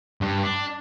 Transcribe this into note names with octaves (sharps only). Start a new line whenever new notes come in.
G2
D4